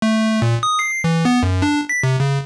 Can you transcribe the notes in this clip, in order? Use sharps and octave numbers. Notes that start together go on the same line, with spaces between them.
A3
A#2
D#6
C7
E3
B3
F#2
D4
B6
C3
C#3